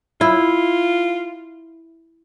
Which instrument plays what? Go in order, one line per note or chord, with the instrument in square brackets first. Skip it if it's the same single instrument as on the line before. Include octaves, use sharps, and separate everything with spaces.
[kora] E4 [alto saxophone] F4